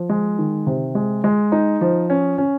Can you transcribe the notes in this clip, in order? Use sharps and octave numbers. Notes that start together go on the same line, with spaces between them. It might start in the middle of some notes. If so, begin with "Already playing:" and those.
Already playing: F3
G#3
D#3
C3
G#3
G#3
D#4
F3
C#4
C#4